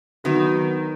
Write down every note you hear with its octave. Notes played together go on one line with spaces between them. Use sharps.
D#3 F#3 B3 F#4 B4